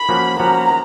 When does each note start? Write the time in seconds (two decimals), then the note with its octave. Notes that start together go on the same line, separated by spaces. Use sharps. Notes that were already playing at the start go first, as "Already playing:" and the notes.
Already playing: B5
0.09 F3 A#3 C#4 F#4
0.39 F3 A#3 C#4 F#4 A#5